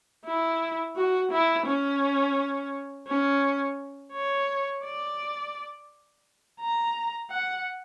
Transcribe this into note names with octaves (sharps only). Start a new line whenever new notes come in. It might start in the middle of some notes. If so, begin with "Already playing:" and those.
E4
F#4
E4
C#4
C#4
C#5
D5
A#5
F#5